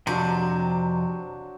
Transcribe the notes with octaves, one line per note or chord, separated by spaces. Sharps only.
F2 C3 F#3 D4 C5